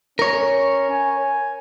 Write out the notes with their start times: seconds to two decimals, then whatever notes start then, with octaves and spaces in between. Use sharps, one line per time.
0.19 C#4 A#4 C#5
0.90 G#5